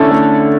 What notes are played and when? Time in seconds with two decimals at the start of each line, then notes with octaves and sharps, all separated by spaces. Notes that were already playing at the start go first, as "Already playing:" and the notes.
Already playing: D3 A3 C#4 E4 A4
0.11 A3